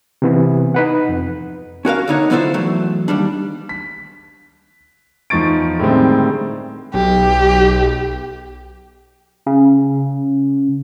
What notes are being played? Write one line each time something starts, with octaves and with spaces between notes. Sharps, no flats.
C3 E3 B3
D#4 B4 F#5
F2
C#4 F#4 A#4 F5
D2 B2 D3 D#4 C#5
F3 B3 E4 F4 A4 C5
E2 F#3 A3
D#2 G#2 G3 D4
B6
E2 F3 D#4 C#6 A6 D7
A2 D3 D#3 G3 G#3 C4
B1 G4
C#3